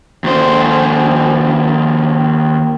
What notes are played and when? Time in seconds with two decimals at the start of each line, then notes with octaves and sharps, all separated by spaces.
0.24 D#2 C5